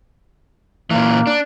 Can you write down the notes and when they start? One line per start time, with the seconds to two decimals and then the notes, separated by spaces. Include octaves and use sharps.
0.91 A#2 E3 A#3
1.27 D4